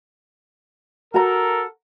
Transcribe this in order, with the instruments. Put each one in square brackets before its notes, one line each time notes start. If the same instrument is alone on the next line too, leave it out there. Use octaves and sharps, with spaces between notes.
[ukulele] F#4 A#5 [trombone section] A4 A#4